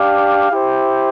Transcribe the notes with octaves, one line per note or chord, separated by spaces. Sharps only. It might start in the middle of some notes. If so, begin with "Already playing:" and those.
Already playing: D4 G4 D5 F5
E4 G4 C5